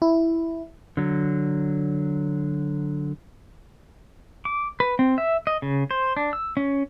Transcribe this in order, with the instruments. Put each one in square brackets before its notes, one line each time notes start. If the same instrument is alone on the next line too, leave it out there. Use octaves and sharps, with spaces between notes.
[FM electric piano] E4
[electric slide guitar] D3 F#3
[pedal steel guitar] D6
B4
C4
E5
D#5
C#3
C5
D4
E6
C#4